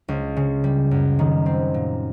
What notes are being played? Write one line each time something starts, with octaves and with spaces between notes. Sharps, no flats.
C#2
C#3
G3
F#2
D#3
C4
A#2